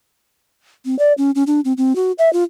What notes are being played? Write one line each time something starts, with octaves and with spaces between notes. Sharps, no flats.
C4
D5
C#4
C#4
D4
C4
C4
F#4
E5
F4